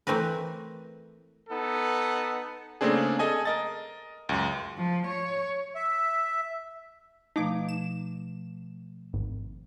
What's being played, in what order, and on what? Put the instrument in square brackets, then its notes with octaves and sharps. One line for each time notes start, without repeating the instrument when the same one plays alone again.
[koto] E3 A3 C4 A#4 B4
[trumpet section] B3 D#4 A4
[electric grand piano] C#3 A3 A#3 C4 D4 G#4
G#4 A4 D#5 G#5
A#4 D#5 A6
C#2 F#2
[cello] F3
C#5
[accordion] E5
[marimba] B2 F3 A3 [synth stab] D#4 D6
[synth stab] E7
G#1